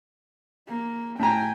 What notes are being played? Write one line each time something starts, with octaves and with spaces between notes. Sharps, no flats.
A#3
A2 G5 G#5 A#5